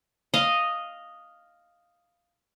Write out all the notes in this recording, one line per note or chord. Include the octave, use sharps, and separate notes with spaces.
D#5 F5